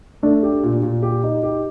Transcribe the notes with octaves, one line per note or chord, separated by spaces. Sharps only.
A3 D4
G4
A#2
A#2
G4
D#4
G4